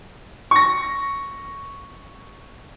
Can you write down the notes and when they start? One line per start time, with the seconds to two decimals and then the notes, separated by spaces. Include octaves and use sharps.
0.51 C#6 A#6